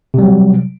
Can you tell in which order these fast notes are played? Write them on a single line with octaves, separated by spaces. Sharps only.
C3 G3 F#3